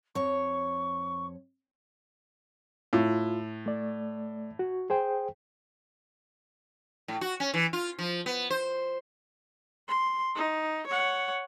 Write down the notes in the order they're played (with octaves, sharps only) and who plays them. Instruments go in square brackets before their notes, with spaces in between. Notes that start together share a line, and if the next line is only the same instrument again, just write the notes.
[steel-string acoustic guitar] F2 C#5 [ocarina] C#6
[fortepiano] A2 [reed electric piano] F4
[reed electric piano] A3 D5
F#4
G#4 C5 G5
[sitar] A2
F#4
C#4
E3
F4
F3
B3
C5
[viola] C6
D#4
C#5 F#5